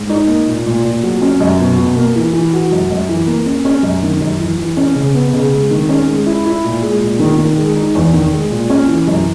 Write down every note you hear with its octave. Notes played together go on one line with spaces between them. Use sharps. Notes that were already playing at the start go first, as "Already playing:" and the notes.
Already playing: G#2
D#4
A#3
A#2
A#2
A#2
F#3
C#4
F#2
B2
B2
A#3
E3
E3
F#4
F#2
F#2
E3
A#3
C#4
C#4
F#2
D#3
F#2
E3
E3
C#4
C#3
B3
C#3
G#3
D#3
C#4
G#3
E4
E4
A#2
G#3
A#2
D#3
D#3
G#3
D#4
E2
D#3
G#3
A#2
C#4
E3
F#2